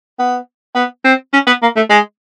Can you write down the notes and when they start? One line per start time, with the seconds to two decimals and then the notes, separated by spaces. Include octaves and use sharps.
0.19 B3
0.75 B3
1.04 C4
1.33 C#4
1.47 B3
1.62 A#3
1.76 A3
1.90 G#3